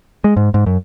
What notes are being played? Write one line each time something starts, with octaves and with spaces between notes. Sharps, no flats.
G#3
G#2
G#2
F#2